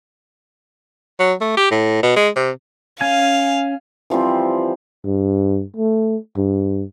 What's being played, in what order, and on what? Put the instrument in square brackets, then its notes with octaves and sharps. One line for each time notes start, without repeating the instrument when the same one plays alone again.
[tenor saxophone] F#3
A3
G4
A2
B2
G#3
C3
[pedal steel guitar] C#4 G#5 [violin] F5
[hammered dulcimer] E3 F3 G3 C4
[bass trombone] G2
A3
G2